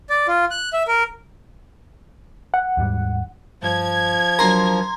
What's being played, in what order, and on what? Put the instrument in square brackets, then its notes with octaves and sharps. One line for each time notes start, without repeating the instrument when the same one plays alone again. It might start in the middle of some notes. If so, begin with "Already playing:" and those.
[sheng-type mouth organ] D5
F4
F#6
E5
A#4
[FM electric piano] F#5
[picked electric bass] D#2 G#2 G3
[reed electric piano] G2 [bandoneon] F3 [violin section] G#6
[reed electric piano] F#3 D4 A#4 [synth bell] A#5 C6